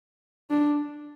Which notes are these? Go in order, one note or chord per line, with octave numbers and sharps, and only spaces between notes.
D4